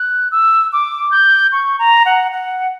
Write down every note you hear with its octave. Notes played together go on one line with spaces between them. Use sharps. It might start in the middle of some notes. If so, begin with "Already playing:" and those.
Already playing: F#6
E6
D6
G6
C#6
A#5
F#5
F#5